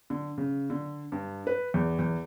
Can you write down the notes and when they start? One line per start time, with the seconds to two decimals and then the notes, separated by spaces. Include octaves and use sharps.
0.10 D3
0.38 C#3
0.70 D3
1.12 G2
1.47 B4
1.74 E2
1.99 E2